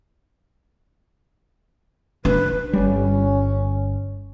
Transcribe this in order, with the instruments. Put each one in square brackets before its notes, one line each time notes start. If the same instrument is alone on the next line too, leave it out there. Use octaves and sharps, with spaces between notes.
[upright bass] D4 [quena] B4
[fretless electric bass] G1 G3 [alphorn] C#4